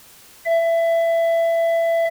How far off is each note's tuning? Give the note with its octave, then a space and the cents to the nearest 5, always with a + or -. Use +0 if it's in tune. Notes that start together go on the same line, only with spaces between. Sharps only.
E5 +20